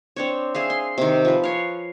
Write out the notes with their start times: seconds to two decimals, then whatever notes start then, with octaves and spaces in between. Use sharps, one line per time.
0.16 C4 D4 C#5
0.55 G#4 E5 F5
0.70 C6
0.98 C3 D#3
1.25 F3 B4
1.43 C#5 F5